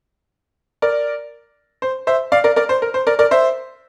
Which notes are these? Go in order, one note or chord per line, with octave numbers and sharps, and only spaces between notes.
A#4 D5
C5
C5 E5
D5 F5
A#4 D5
A#4 D5
C5
A#4
C5
A#4 D5
A#4 D5
C5 E5